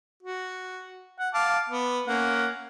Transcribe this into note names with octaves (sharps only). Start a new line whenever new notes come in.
F#4
F#5
F5 A5 D6
B3
A#3 C#4 F#5